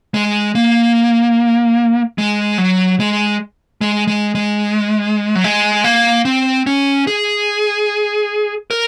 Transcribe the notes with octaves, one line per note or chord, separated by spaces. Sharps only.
G#3
A#3
G#3
F#3
G#3
G#3
G#3
G#3
F#3
G#3
A#3
C4
C#4
G#4
A#4